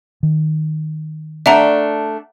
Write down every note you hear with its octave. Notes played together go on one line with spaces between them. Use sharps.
D#3
A3 D4 E5 F#5 A#5